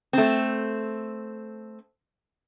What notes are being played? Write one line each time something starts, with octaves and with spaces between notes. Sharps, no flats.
A3 C4